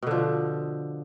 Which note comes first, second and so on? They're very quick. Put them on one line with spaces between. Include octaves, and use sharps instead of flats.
B2 D3 F3